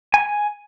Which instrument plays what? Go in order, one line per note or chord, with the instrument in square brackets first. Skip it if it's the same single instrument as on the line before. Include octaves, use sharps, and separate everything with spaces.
[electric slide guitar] G#5